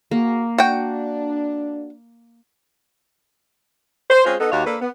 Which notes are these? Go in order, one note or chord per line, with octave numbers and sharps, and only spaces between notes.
A#3 F#4 G#4
D4 F#4 G5
C5
G#3 C4 C#4 F4 G#4 C5
B3 D#4 A4
D#2 F#4 G4 C#5 D#5 F5
A#3 D4 A4 B4
B3